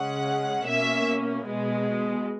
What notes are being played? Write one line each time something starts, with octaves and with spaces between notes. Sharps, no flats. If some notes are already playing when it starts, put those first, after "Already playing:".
Already playing: C#3 G#3 C#4 F#5
B2 A#3 C#4 E5
B2 G#3 B3